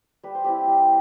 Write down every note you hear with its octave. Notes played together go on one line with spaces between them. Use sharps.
G3 B4
C5
C4 E4 G4 B4
G3